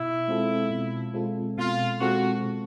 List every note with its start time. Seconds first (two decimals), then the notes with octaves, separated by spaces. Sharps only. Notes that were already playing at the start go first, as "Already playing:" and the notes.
Already playing: B2 E4
0.28 G#3 C4 F4 A4
0.70 B2
1.14 G#3 C4 F4 A4
1.57 B2 F4
2.00 G#3 C4 F4 F#4 A4
2.44 B2